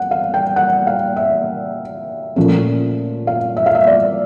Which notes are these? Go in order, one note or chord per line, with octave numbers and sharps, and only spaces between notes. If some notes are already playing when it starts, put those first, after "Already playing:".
Already playing: F#5
F5
G5
F#5
F5
E5
A#2 F3 A3 C#4
F5
E5
F5
E5
D5